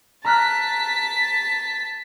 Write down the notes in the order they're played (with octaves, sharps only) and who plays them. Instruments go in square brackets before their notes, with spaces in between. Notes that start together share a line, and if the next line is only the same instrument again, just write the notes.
[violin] A5 B6 [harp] A#5 F6 F#6